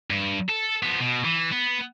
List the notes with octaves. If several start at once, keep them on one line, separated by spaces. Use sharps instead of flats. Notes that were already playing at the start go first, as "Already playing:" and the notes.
G2
A4
F3 B3
B2
E3
B3